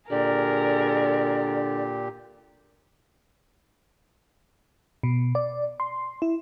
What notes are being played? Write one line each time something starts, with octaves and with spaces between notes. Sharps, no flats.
A#2 D3 G4 G#4 A#4 D5
B2
D5
C6
E4